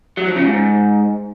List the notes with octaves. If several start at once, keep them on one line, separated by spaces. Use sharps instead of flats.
F#3
F3
C#3
G#2